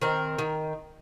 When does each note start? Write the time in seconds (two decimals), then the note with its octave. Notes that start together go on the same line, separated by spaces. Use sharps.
0.02 D#3 C4 A#4
0.39 D#3